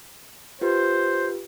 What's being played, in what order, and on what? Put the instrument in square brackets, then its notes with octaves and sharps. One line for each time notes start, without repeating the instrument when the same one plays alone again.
[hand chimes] F4 G4 B4 [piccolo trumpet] C5